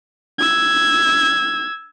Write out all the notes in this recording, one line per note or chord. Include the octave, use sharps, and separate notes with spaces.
E6 G#6